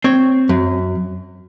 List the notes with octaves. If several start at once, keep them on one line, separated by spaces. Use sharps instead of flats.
C4 C#5
F#2